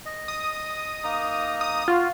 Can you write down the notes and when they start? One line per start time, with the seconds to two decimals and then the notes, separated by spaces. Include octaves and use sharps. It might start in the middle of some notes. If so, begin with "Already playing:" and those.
0.06 D#5
0.28 D#6
1.04 A#3 D#4 A#5
1.61 D#6
1.88 F4 F#4